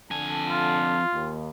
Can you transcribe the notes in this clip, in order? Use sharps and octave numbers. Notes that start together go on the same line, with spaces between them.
F2 D3 G#5 A5
F4
D#2